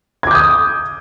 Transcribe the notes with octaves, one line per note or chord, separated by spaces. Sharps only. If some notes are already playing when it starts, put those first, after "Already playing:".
D6 D#6 G6 G#6